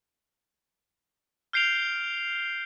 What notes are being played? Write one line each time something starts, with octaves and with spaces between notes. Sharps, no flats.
F6 G6 C7 D7 F7 G7